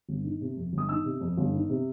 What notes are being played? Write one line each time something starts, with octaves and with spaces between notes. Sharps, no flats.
G1
D#3
C3
F2
G1
D#6
D#3 E6
C3
F2
G1
D#3
C3